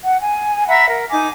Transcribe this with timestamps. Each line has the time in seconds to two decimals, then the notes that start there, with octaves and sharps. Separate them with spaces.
0.04 F#5
0.21 G#5
0.68 E5 F#5 A#5 B5
0.89 A#4
1.11 D#4 G#5 D6